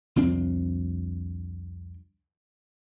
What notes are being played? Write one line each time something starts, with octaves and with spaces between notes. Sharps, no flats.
C2 F2 C4 D4